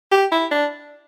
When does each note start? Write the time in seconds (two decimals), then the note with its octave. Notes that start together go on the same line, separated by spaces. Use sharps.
0.11 G4
0.32 E4
0.51 D4